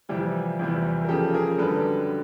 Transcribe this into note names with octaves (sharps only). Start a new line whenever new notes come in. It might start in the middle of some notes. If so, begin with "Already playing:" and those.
F2 C3 E3 G3 F4 G4
E2 C3 E3 G3
A#4
F2 C#3 F3 G4 A4
G#4 A#4
F#2 D3 G3 A4 B4